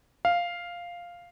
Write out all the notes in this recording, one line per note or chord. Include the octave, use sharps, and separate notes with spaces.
F5